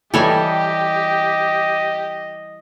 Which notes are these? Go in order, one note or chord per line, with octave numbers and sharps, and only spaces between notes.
E3 G3 G4 A4 C#5 D#5 G#5